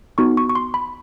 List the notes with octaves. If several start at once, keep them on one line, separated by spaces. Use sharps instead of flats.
B3 D#4 F#4 C#6
C#6
C#6
C6
B5